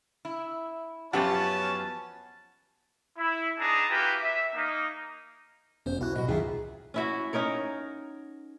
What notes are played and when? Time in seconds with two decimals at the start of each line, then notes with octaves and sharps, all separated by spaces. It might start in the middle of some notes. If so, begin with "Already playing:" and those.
0.25 E4
1.13 F#2 F3 B3 C#4 F4 G4 F#5 A5
3.18 E4
3.59 B3 D4 D#4 G#4 A5 A#5
3.89 A#3 E4 F#4 G4 B4
4.22 E5
4.55 A#3 D#4
5.86 F1 B3 C#4 C5
6.01 C2 E4 F#4 F#6
6.16 B2 F#4 D#5
6.28 C#2 F#2 A#2 D#3 F4 G#4 E5
6.94 C#4 E4 F#4
7.33 C#4 D#4 A#4 C#5